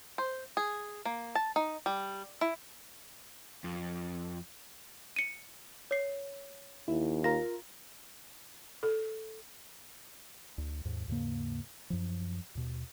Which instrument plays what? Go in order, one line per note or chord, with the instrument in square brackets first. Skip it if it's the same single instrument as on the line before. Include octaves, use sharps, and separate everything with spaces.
[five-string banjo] C5
G#4
A#3
A5
D#4
G3
E4
[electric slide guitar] F2
[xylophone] C#7 D#7
C#5 C7
[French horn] D#2 [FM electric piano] E4
[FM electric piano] F4 A#4 [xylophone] A#6
[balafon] A4
[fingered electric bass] D2
D#2 G#2
D#2 G#2 C#3 A#3
F#2 F3
D#2 B2